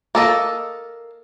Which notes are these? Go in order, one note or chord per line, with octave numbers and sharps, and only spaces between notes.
A#3 A4 D#5